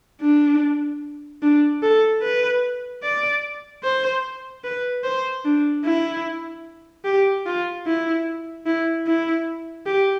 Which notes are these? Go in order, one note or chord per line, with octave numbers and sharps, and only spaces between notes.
D4
D4
A4
B4
D5
C5
B4
C5
D4
E4
G4
F4
E4
E4
E4
G4